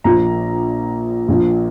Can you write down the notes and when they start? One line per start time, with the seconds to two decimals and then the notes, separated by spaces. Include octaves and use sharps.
0.04 A#1 A#2 F3 A#5
1.28 A#1 A#2 F3